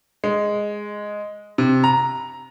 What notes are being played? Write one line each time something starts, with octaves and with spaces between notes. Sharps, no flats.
G#3
C3
A#5